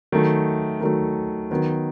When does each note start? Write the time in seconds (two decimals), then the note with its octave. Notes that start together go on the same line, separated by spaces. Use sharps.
0.12 D#3 F#3 A3
0.81 D#3 F#3 A3
1.51 D#3 F#3 B3